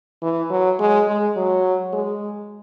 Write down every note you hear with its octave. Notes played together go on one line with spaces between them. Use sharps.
E3
F#3
G#3
G#3
F#3
G#3